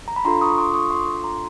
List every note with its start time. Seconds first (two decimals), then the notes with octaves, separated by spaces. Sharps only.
0.08 A#5
0.16 B5
0.25 D4 F4 A4 A#5 C6
0.41 C#6 D#6
0.58 C6 D6
0.74 C#6 D#6
0.91 C6 D6
1.24 A#5 C6